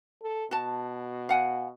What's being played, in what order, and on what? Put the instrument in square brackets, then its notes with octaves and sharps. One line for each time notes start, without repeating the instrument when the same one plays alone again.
[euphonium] A4
[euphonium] B2 [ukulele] F#4 A5
[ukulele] F5 F#5 G#5